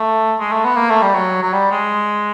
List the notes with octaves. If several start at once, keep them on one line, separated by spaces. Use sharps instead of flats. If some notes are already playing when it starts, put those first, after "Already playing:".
Already playing: A3
G#3
A3
B3
A#3
A3
G3
F#3
F#3
G3
G#3